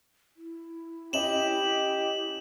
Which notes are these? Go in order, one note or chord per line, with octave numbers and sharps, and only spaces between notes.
E4
C#4 G4 D#5 E7 F#7